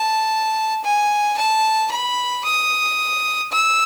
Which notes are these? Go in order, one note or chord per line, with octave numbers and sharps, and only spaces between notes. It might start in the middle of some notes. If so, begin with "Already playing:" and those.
Already playing: A5
G#5
A5
B5
D#6
E6